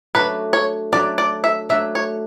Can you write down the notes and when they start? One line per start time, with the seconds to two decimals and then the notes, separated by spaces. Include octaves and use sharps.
0.15 F#3 A3 D4 B4
0.53 C#5
0.92 F#3 A3 D4 D5
1.18 D5
1.44 E5
1.69 F#3 A3 D4 E5
1.95 C#5